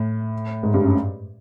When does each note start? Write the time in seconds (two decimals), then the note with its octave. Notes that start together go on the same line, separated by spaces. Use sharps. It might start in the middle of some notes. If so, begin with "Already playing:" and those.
Already playing: A2
0.63 G#2
0.74 G2
0.84 F#2